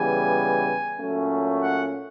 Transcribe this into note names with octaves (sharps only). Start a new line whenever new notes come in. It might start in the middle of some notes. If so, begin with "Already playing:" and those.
Already playing: C#3 E3 G3 B3 G#5
A#2 F#3 A3 C#4
F#5